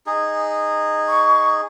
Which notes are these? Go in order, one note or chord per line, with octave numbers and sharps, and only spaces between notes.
D#4 G#4
C#6